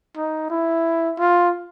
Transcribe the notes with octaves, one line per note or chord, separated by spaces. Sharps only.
D#4
E4
F4